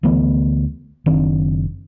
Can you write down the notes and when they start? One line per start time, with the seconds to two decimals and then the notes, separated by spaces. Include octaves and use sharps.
0.03 D2 E3 A3 B3
1.06 F#1 D#3 C4 D4